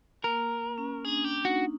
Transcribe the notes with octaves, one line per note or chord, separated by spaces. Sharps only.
A#3 A#4
C#4
D4 G#4
D4 G4
D#4 F#4